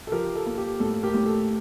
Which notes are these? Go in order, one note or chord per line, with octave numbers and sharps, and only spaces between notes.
A4
F3 G4 A#4
A4
A#3
G4
A2 A4
G4 A#4
A2
A4